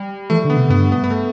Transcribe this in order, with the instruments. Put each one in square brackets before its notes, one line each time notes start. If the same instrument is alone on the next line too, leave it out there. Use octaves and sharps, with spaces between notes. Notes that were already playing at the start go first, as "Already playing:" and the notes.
Already playing: [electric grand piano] G3
[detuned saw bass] E3 [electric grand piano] A3
[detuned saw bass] D3
[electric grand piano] B3
[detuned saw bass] C3
[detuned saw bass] G2 [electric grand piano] B3
[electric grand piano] B3
B3
A3